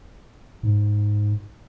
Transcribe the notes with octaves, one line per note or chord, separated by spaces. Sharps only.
G#2